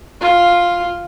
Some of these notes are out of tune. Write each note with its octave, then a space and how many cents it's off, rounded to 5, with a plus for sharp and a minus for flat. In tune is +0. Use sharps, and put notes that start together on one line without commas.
F4 +0